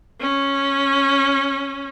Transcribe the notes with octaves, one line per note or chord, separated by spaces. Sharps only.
C#4